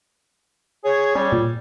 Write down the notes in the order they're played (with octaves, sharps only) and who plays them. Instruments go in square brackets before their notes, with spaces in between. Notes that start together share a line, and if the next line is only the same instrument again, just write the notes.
[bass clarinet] G#4 [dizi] C#5
[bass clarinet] G3 [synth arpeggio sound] C#4
[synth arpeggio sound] A#2